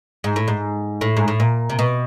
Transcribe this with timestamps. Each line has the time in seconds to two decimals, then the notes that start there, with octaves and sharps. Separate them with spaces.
0.24 G#2
0.36 A2
0.48 G#2
1.01 A2
1.17 G#2
1.28 A2
1.40 A#2
1.70 C3
1.79 B2